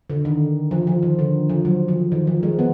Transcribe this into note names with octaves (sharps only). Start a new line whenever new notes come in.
D3
D#3
F3
F3
D#3
D3
F3
F#3
F3
D#3
F3
G#3
B3